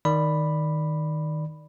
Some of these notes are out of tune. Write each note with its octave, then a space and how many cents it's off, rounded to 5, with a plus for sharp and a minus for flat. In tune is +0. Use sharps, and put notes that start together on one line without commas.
D#3 +0 D5 +0 B5 +0